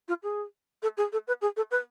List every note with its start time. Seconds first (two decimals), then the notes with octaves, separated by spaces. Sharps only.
0.08 F4
0.23 G#4
0.82 A4
0.97 G#4
1.12 A4
1.27 B4
1.41 G#4
1.57 A4
1.71 B4